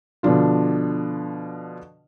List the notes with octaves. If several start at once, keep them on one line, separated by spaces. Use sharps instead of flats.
B2 D3 F3 D4 F4